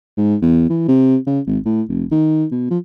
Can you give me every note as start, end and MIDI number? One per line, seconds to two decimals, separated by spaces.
0.17 0.36 44
0.42 0.66 40
0.69 0.86 52
0.88 1.17 48
1.27 1.40 49
1.47 1.58 32
1.65 1.82 45
1.89 2.04 29
2.11 2.45 51
2.51 2.67 47
2.70 2.78 53